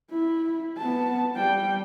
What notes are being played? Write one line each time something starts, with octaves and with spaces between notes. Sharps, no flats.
E4
B3 A5
G3 G5